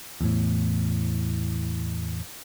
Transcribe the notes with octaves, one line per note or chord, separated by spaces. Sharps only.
E2 A2